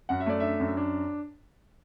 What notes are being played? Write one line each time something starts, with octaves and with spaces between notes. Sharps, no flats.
F#2 F#5
E5
A3 D5
D4 E5
F#2
D4